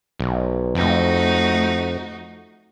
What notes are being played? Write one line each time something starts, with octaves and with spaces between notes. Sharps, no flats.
B1
F2 A3 D#4 F#4